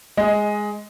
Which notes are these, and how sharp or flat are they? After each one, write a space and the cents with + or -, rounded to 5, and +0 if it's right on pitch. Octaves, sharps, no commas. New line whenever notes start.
G#3 +0 D#5 +15